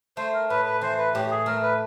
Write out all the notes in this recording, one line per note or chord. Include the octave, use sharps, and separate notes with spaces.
A3 C5
A#4
A2 B4
B4
E3 C5
B4
A2 G4
G4
G#4
A3 A#4
B4